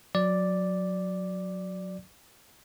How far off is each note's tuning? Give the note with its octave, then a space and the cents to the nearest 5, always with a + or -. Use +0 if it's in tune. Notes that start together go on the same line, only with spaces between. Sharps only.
F#3 -20 D5 +0